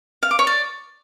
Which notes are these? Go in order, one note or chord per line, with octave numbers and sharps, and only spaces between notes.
F5
D6
C#5
D5